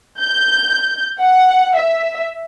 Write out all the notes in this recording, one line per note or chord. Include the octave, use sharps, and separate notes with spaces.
G6
F#5
E5